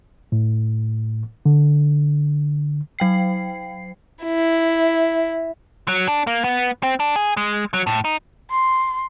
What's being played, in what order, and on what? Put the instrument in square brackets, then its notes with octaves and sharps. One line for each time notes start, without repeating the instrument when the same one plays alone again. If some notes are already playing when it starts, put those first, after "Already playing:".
[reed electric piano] A2
D3
[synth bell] F#3 G5 C7
[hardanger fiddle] E4
[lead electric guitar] F#3
D4
A#3
B3
C4
D4
G#4
G#3
F#3
A2
D#4
[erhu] C6